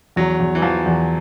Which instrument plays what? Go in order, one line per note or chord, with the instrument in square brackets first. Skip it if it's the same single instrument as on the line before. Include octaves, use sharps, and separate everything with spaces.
[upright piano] E2 [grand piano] F#3
[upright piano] E2
[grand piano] E3
[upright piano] E2 [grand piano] F3
[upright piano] E2